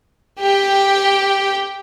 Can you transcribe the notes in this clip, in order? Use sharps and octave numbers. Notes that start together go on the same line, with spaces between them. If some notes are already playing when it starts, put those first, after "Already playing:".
G4 G5